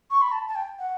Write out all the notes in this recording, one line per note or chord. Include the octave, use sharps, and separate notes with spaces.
C#6
B5
A5
A5
G5
F#5